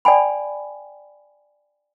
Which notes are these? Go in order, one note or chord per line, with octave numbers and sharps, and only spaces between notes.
D5 G5 G#5 B5